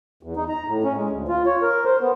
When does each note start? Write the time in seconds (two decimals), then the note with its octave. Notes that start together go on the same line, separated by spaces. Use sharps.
0.23 E2
0.36 D#4
0.48 A#5
0.68 A2
0.84 C#4
0.97 G#3
1.10 D2
1.28 F4
1.46 C#5
1.62 A#4
1.84 C5
2.01 B3